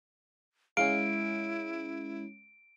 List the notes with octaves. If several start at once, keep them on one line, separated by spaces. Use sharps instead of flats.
G#3 C#4 E4 F5 D7